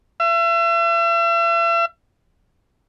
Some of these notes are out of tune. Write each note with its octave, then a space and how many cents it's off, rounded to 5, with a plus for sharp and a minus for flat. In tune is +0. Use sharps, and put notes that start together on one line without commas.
E5 +40